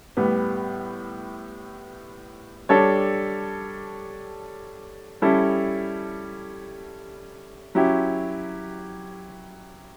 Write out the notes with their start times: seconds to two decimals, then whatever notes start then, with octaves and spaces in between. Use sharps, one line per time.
0.17 A2 G3 B3
2.69 G3 D4 A4 C#5
5.22 G3 C#4 E4 A4
7.75 F#3 C#4 E4 G4